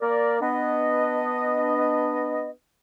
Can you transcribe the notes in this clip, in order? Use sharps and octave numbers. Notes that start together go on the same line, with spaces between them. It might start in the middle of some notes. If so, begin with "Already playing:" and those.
A#3 A#4 D5
B3 D4 D#5